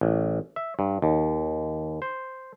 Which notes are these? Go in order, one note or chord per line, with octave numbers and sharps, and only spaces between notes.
A1
E5
G2
D#2
C5